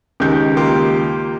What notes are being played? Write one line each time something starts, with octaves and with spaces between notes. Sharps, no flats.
C#2 D#3 G4 G6
A#3 F4 G4